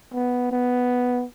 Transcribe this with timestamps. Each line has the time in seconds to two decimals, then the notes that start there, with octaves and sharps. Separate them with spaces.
0.13 B3
0.51 B3